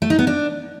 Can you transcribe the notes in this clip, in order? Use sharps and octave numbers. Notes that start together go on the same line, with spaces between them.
A3
D#4
B3
D4